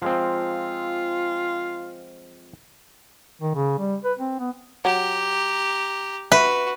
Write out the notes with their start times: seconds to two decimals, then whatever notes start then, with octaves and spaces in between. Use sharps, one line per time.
0.02 F3 G#3 C4 F4
3.41 D#3
3.55 C#3
3.79 G3
4.04 B4
4.18 C4
4.39 B3
4.85 F#3 G4 A#5
6.32 F#4 B4 E5